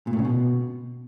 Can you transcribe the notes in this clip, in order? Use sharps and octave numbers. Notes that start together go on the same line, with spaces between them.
A#2
A2
C#3
B2